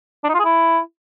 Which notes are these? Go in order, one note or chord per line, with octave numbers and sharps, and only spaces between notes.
D4
D#4
F4
G#4
E4